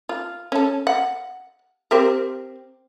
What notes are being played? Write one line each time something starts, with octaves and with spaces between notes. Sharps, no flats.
F4
C#4 A4
F#5
C4 G4 A#4